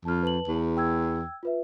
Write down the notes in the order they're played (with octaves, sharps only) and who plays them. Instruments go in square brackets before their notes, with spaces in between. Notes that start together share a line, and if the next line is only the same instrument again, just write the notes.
[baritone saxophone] F2 [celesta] A5 F6
[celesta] B4 A5 F#7
[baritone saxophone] E2
[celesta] G5 E6 G#6
F4 B4 E5